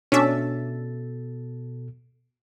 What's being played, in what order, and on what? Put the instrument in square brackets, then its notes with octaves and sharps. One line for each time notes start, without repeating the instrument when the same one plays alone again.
[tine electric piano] B2 A4 A6 [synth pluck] C#4 D4 E5